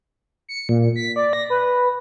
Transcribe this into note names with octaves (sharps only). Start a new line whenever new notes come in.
C#7
A#2
B6
D5
A#6
B4